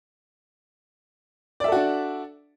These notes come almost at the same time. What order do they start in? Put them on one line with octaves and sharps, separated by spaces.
D5 E5 A4 F#4 D4